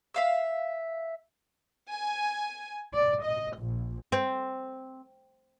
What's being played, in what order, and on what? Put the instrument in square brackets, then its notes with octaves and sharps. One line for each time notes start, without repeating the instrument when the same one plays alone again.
[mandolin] E5 F5 E6
[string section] G#5
D5
D#5
A#1
[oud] C4